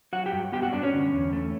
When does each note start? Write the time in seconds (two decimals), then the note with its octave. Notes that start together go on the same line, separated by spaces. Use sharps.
0.13 F#3 F#4 F#5
0.26 G4 G5
0.33 G2
0.52 B3 G4 G5
0.62 F#4 F#5
0.73 G2 D4 D5
0.83 C#4 C#5
0.93 D3
1.12 E2
1.33 A3